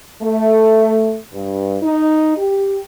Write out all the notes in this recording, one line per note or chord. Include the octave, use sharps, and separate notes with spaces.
A3
G2
D#4
G4